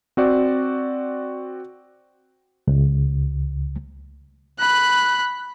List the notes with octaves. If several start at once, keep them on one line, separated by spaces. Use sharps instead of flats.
C4 F#4 D5
C#2
B5 F#6